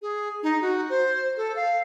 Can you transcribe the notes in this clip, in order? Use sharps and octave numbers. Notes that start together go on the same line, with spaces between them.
G#4
D#4
F#4
C5
A4
F5